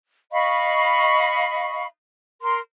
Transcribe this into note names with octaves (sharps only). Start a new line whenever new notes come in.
D#5 F5 B5 C#6
A#4 C6